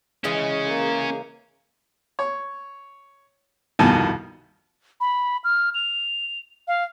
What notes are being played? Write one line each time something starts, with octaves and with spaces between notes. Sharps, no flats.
C#3 E3 G#3 C#4 G#4
A#3
C#5
C2 F2 B2 D#3 G#5 A5
B5
F6
F7
F5